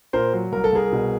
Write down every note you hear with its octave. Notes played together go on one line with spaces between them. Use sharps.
A#2 A#4 C5
F#3
C2 A#4
A4
C2 G#4 A#4
B2